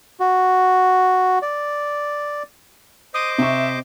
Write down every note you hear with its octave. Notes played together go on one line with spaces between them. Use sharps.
F#4
D5
C5 D#5 D6 D#6
C3 E5 C#6